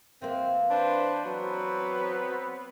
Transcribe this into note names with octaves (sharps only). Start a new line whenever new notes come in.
E3 A#3 C4
D4 B4 C5
F#3 B3 C4 B4